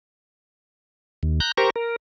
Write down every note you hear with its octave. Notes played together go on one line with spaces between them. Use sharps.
D#2
A#5 F#6 G6
G4 A#4 C5 A#5 C#6
A#4